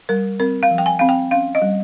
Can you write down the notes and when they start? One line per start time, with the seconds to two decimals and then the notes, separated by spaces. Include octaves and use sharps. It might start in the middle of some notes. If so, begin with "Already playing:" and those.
0.09 G3 A#4
0.40 C4 A#4
0.63 F5
0.71 F3
0.78 G5
0.86 G#5
0.99 C4 F5
1.09 G5
1.31 C#4 F5
1.55 D#5
1.62 G3